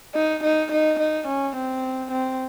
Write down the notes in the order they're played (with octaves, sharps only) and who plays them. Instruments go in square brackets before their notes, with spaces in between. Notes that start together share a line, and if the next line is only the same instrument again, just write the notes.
[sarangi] D#4
D#4
D#4
D#4
C#4
C4
C4